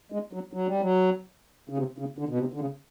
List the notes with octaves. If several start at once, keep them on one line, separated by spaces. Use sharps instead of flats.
G#3
F#3
F#3
G3
F#3
C#3
C3
C#3
D3
B2
C3
D3
C#3